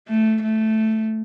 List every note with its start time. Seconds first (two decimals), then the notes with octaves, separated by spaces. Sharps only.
0.08 A3
0.43 A3